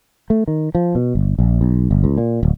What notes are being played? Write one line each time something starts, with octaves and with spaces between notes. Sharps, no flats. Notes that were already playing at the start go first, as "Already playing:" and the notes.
A3
D#3
F3
B2
G1
A#1
B1
G1
C#2
A#2
D1